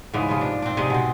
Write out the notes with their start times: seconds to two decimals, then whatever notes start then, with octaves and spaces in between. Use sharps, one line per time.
0.14 G#2 C#3 E3 G#3
0.28 C3 F3 G#3
0.41 D4
0.62 C4 D4
0.77 C3 G#3 G#4 D#5
0.90 B2 C4